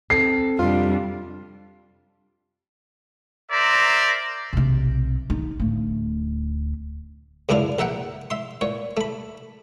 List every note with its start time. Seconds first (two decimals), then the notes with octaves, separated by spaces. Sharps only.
0.10 C4 A4 C7
0.59 F2 C3 G3 D4 F4
3.50 A#4 C5 D5 E5 A#5
4.53 B1 C3
5.30 D#4
5.60 D1 A3
7.49 C#2 F#2 D4 E4 F5
7.79 A#1 A#4 E5 F#5 G5
8.30 E5 C6
8.61 A#2 C#5
8.97 A3 B5